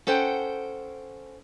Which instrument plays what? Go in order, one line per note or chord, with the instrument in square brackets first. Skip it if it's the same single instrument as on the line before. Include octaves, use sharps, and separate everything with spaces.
[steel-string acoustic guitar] C#4 A4 C5 F#5 G5